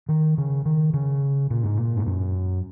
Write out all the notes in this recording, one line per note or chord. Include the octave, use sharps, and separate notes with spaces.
D#3
C#3
D#3
C#3
A#2
G#2
A#2
G#2
F#2